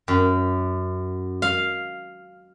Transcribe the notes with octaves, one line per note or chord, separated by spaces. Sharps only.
F#2
F5